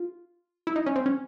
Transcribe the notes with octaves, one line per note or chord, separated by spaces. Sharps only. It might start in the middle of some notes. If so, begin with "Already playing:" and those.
Already playing: F4
E4
D#4
C#4
C4
C#4